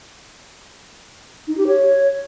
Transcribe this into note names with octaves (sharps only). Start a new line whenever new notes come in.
D#4
G4
C#5